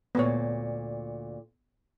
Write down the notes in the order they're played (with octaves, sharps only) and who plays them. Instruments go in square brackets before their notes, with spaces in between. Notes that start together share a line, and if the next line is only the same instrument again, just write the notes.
[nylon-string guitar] D2 A#2 [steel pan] B3 C#5